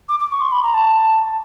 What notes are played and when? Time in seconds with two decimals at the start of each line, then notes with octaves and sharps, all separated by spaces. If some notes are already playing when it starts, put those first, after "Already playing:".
0.09 D6
0.20 D6
0.31 C#6
0.41 C6
0.52 B5
0.63 A#5
0.74 A5